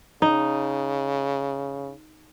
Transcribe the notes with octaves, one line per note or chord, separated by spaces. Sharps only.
C#3 D#4